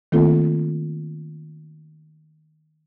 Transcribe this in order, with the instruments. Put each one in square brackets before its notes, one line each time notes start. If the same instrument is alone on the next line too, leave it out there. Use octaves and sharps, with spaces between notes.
[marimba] D#3 A3 A#3 C4 F4 A4